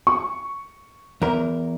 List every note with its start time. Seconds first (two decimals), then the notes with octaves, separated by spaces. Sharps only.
0.07 C#6
1.22 E2 A#4